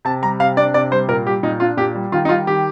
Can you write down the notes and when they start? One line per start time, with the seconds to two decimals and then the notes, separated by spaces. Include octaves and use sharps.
0.05 C3 A5
0.22 G3 A#5
0.40 C3 F5
0.57 D4 D5
0.74 C3 D5
0.91 G3 C5
1.08 A#2 A#4
1.26 G3 G4
1.43 A#2 D#4
1.60 D4 F4
1.77 A#2 G4
1.95 G3
2.12 D#3 F4
2.25 D#4
2.29 G3 F4
2.47 D#3 G4